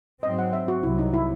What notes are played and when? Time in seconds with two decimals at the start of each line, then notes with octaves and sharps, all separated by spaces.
0.23 G#2 F#3 C4 D#5
0.39 F#5
0.53 E5
0.68 F#4
0.83 C2 C3 F#3 E4
0.99 D#4
1.14 E4